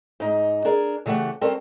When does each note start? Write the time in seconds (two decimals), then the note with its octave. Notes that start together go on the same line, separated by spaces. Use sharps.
0.20 G#2 D#4
0.65 D4 G#4 A#4
1.06 C#3 E3 A3 G4 F#5
1.41 G3 C4 C#4 A4 A#4 C5